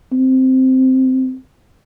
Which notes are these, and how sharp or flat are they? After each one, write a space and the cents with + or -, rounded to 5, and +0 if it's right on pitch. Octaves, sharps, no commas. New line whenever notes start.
C4 -5